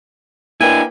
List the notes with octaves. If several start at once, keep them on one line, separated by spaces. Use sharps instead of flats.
A#3 D4 E4 B4 G5 G#5